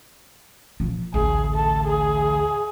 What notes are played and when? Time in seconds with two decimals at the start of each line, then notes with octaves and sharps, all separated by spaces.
0.80 A#2 F3
1.14 A1 D2 G#4
1.54 A4
1.87 G#4